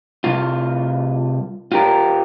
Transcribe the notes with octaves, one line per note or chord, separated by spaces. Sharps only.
C2 F4
F4 G4 A#4